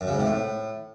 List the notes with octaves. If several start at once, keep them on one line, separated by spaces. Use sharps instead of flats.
F#2
C#3
G#2
C3
A2